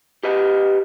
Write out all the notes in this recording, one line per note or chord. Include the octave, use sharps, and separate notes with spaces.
G4 B4 D#5